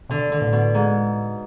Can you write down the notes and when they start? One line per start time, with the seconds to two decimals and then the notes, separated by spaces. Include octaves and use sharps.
0.10 B2 D3
0.32 D3
0.42 A2
0.53 B2
0.74 G#2